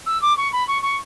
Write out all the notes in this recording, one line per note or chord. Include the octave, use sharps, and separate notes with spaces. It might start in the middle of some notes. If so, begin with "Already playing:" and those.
E6
D6
C#6
B5
C#6
C#6